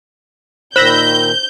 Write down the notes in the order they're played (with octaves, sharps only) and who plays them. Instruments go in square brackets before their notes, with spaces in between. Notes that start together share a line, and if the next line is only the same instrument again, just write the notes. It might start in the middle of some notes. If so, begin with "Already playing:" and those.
[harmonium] A#2 D#3 [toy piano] C5 [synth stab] B5 E6 A#6 [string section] G6